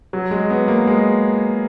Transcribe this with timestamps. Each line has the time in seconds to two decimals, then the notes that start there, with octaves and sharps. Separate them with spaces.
0.13 F#3
0.31 G#3
0.50 B3
0.68 A#3
0.87 G#3